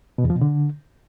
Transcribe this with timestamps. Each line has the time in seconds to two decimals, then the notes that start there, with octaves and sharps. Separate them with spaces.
0.18 B2
0.24 E2
0.30 F3
0.36 B2
0.41 D3